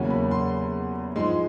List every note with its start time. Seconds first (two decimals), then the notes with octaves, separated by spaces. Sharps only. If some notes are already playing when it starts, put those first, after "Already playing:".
Already playing: E2 C#3 F#3 A#3 C#4
0.10 B5
0.31 C6
1.16 G#2 F3 G#3 C6